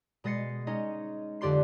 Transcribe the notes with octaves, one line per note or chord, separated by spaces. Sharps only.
B2 G#3 D#5 A6 C7 C#7
G#3 C#4 D#4 D#5
F2 D3 G4 D5 C6 C7